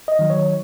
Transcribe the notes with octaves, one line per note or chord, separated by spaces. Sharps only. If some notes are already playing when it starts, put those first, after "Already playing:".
D#5
D#3 F#3
C#5